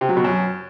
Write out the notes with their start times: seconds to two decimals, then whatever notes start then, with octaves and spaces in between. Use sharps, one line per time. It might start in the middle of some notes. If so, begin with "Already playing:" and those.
0.01 C3
0.09 F#3
0.17 B2
0.24 F#2